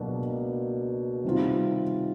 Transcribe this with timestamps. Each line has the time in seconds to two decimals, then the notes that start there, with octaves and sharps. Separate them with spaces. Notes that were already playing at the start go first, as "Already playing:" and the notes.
Already playing: C#2 B2 F#3 A#3 D4
1.24 C3 D#3 G3 C4 F4